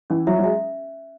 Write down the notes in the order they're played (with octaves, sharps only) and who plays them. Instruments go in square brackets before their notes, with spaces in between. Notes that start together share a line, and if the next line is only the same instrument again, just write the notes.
[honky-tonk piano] E3 [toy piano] C#4
[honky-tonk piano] F#3 [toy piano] E5
[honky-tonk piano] F#3
[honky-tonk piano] G#3 [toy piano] E5